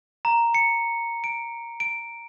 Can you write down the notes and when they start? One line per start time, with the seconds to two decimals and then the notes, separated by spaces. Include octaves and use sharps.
0.25 A#5
0.54 C#7
1.24 D7
1.80 D7